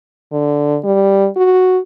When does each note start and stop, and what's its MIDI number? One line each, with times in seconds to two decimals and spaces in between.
0.33 0.78 50
0.84 1.28 55
1.37 1.79 66